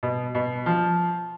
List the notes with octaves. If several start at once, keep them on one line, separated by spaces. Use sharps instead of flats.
B2
B2
F3